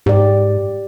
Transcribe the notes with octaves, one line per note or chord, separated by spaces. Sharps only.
G#2 G4 D5